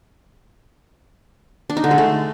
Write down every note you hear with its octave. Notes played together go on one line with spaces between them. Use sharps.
D4
D#4
D3
G#3
A3